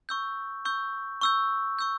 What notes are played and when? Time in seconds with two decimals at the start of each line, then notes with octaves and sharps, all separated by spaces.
0.09 C#6 E6 G6
0.65 C#6 E6 G6
1.21 C#6 E6 G6
1.79 C#6 E6 G6